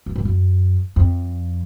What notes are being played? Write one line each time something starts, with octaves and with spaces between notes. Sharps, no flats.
F#2
G#2
F#2
F2